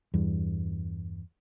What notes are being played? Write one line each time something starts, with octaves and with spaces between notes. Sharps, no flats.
E2 G2